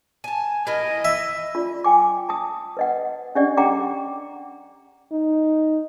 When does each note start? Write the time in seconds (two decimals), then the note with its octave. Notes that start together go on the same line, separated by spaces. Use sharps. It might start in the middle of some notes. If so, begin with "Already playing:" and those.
0.24 G#5 A5
0.67 E4 A#4 D#5
1.05 E5
1.55 F4 D5
1.84 G5 G#5 D6
2.29 A5 D#6
2.77 B4 D#5 F#5
3.35 C#4 D4 G4 D5 D#5 F#5
3.57 G4 C#5 F#5 G5 A#5 D6
5.12 D#4